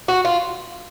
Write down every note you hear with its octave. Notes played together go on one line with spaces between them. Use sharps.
F#4
F4